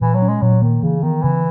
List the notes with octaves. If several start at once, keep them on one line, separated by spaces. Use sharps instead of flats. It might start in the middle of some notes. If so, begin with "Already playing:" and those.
A#2 E3
F#3
C#4
G#3
A#2 F#3
D#3 A#3
C#3 E3
D#3 B3
C#3 E3